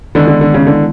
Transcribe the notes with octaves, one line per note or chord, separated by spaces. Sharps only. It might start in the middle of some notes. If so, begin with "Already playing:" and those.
D3 D#3 G#3 B3 E4
D3
D3
C#3
D3